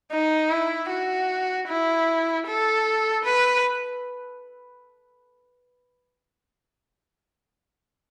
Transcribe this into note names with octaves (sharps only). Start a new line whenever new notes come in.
D#4
E4
F#4
E4
A4
B4